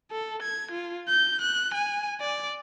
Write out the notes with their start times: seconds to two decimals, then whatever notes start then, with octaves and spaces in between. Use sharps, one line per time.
0.11 A4
0.43 G#6
0.72 F4
1.09 G6
1.41 F#6
1.75 G#5
2.21 D5